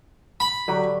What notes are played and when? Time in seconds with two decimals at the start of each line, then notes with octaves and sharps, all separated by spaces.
0.40 B5
0.68 D3 F#3 G4